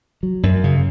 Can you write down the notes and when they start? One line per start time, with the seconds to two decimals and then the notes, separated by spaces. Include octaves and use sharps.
0.23 F#3
0.43 F#2
0.64 C#3